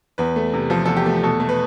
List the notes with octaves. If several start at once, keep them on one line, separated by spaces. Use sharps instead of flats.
E2 B4
A3
C3
F3 A4
E2 A4
G4
A3
B2 A4
A3
B4